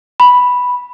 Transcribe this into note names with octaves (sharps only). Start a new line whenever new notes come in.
B5